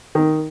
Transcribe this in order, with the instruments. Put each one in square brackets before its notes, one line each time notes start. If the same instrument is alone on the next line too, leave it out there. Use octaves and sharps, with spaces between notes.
[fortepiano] D#3